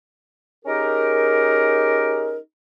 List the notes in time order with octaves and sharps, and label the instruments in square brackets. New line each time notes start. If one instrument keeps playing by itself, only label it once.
[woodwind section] C#4 D#4 G4 G#4 A#4